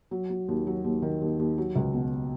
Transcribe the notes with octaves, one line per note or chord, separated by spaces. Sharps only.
F#3
F#3
D#2
F#3
D#2
D#3
D#2
D#2
F#3
C#2
B2